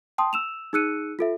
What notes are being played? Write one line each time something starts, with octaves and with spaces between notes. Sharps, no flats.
G5 A5 C6 D#6
E6 E7 F7
D#4 G#4 E6 F#6 C#7 D#7
F4 A4 E5